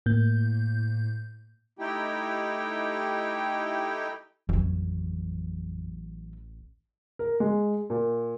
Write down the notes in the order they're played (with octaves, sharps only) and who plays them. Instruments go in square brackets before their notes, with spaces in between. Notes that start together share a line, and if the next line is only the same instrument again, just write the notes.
[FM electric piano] A2 A#3 G6
[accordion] A3 D#4 E4 G4 G5
[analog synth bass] A1 [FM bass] F2 [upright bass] E3 F#3
[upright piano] A#4
G#3
A#2